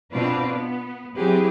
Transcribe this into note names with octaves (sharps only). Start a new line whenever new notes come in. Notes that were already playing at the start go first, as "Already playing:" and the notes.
B2 C4 D4 F4 B4 D5
B3
F#3 C4 E4 G4 G#4 B4